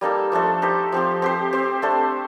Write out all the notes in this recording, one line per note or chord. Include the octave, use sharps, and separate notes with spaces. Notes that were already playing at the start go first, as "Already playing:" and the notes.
G3 A#3 D#4 A4
F3 A3 D4 A4
D#4 G4 C5
F3 C4 G4
C4 G4 C5
C4 G4 C5
A3 D4 A4 C5